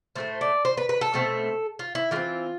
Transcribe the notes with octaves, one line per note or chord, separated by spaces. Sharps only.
A2 F3 A3 C5
D5
C5
B4
B4
A4
B2 A3 C4
F4
E4
E3 G#3 C4 F4